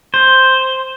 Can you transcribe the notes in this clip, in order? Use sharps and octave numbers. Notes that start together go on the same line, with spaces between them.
C5